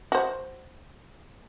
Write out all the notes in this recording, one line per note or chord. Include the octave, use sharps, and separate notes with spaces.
F#4 C5